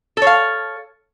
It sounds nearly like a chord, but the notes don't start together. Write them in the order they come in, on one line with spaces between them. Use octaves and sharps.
A4 C#5 F5